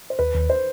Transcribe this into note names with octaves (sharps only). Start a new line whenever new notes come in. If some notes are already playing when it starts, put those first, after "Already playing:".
C5
D#2 B4
D#2
C5